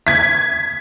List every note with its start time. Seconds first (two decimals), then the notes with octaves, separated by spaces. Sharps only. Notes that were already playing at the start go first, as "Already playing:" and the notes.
0.07 G#6 B6